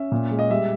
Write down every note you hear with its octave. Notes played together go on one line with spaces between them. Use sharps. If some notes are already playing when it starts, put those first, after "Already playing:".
Already playing: C#4 E5
A#2
G#3
D#5
G3 E5